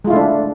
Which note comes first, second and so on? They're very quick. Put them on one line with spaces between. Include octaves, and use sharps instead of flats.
G#3 F4 E4 A3 D4